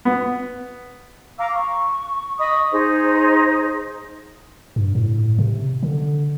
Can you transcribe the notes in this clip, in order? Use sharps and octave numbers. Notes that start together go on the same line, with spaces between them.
B3
F5 A#5 D6 E6
C#6
D#5 B5 C#6 D#6
D#4 G#4 C5
G2
A2
C3
D3